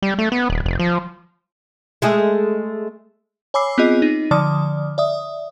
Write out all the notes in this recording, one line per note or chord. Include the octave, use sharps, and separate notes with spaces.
G3
A3
B3
D#1
F1
F3
G#3 A3 G#4
C#5 G#5 B5 D6 E6 C7
B3 C4 F4 G#4 D#5
D#4
D3 F3 D5 D#6
D5 E5 D#6